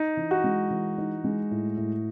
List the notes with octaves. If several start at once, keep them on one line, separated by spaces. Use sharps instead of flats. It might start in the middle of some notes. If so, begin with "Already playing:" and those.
Already playing: D#4
E3
F#4
G#3
E3
D#4
G#3
A2
A2